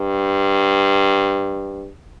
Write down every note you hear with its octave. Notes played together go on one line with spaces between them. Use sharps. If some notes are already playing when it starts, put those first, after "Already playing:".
Already playing: G2